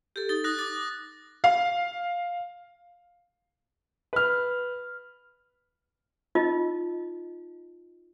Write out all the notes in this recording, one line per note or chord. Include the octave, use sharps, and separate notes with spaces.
G4 A4
D#4 A6
D#6 F#6 A#6
D6 A6
F5
B4 F6
D#4 F4 D#5